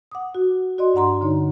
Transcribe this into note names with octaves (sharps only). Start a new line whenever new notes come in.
F#5 D6 D#6
F#4
F#4 D5 D#5 C6
G2 D4 F#5 A#5 C6
D3 D#4 C#5